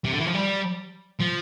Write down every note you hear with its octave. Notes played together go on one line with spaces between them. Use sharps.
C3
D3
E3
F3
G3
F3